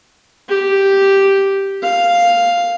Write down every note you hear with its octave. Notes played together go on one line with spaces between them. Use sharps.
G4
F5